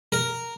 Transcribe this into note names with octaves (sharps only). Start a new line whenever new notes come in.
A#4